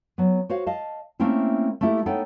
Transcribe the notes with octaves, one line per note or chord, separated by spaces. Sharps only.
F#3 B3
F#4 C5 C#5 F5 F#5
D#5 F5 A5
A3 A#3 C4 C#4 E4
A3 A#3 D#4 E4 G4 A4
B3 D#4 A4 C#5 F#5 G5